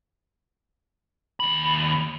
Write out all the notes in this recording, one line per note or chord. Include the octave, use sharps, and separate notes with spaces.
D#2 B5